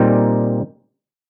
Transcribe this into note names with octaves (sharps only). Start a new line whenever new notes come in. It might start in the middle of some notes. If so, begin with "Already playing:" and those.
Already playing: A#2 G3 C4 D#4